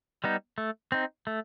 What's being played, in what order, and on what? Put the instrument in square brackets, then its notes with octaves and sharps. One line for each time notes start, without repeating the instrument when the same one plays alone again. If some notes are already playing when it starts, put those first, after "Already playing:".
[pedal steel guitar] G3 B3 D#4
A3
C4 D#4
A3